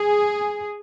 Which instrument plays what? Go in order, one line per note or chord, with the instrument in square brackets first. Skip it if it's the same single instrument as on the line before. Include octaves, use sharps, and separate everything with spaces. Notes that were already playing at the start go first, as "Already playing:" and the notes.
Already playing: [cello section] G#4